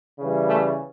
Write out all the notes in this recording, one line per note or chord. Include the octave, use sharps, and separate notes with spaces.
C#3 E3 G3
A3